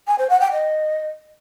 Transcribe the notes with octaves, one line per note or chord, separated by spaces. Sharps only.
G#5
C5
F#5
G5
D#5